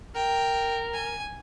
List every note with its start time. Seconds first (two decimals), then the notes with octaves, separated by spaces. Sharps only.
0.15 A#4 G5
0.94 G#5